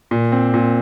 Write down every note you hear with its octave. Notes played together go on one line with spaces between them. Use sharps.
A#2
C4
A#2